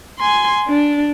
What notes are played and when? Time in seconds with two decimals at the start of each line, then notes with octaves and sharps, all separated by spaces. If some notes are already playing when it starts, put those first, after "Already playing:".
0.19 G#5 C6
0.68 D4